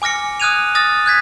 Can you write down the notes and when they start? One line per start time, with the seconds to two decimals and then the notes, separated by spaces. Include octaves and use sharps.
0.02 G#5 D6 F6 A#6 C#7
0.40 D#6 F6 F#6 G#6 D#7 F7
0.75 D#6 F6 A6 A#6
1.06 F#6 G#6 B6